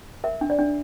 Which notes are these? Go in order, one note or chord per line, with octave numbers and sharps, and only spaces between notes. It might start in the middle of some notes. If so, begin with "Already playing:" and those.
A#4 E5
D4
D5
D4